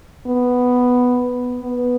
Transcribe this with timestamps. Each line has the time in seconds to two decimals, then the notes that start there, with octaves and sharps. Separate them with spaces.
0.27 B3
1.63 B3